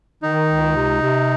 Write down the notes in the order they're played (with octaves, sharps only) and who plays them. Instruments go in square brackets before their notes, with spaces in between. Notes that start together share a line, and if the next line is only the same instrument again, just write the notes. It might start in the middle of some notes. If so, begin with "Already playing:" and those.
[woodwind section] D#3 [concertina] D#4
[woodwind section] C#2
C3
C3